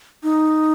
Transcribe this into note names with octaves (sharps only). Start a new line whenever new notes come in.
D#4